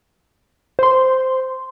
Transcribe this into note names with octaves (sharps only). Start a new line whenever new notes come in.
C5 C6